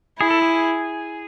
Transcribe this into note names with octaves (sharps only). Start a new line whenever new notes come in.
E4 G#4
A4
G#4